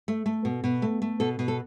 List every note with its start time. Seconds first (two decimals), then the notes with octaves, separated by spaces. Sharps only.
0.08 A3
0.26 A3
0.45 B2
0.64 B2
0.82 A3
1.02 A3
1.20 B2 A4
1.39 B2
1.48 A4